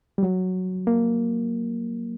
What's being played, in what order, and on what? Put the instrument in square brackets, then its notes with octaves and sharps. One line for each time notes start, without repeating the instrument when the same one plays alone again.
[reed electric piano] G3
F#3
A#3